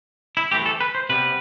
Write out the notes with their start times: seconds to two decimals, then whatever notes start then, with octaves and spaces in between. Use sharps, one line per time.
0.37 E4
0.51 E3 A3 C4 G4
0.62 G4
0.66 A4
0.81 B4
0.95 C5
1.09 C3 G3 B3 B4